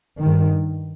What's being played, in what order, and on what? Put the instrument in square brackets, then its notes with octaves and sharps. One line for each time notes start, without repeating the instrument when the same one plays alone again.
[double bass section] G2 D#3